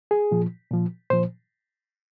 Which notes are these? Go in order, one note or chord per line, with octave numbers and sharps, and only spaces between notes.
G#4
A#2 F3
A#2 F3
A#2 F3 C5